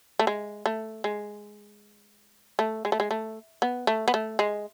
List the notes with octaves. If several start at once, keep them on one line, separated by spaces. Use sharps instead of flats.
A3
G#3
A3
G#3
A3
G#3
A3
G#3
A3
B3
A3
B3
A3
G#3